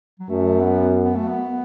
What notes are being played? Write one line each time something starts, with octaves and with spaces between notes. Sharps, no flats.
F#3
F#2 A3
B3
B3
A3
B3